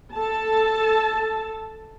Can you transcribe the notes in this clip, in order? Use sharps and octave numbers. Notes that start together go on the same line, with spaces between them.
A4 A5